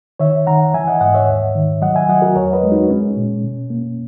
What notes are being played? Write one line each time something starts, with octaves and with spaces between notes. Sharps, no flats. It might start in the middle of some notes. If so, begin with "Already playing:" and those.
D#3 C#5 E5
D#3 F#5 A#5
E3 E5 G#5
D#5 F#5
G#2 D#5 F#5
C#5 E5
D#2
D#3
F#3 D#5 F#5
E5 G#5
F#3 D#5 F#5
F#4 A#4
E2 A#4 C#5
B4 D#5
G#3
D#4 F#4
G#3 C#4
A#2
B2
A#3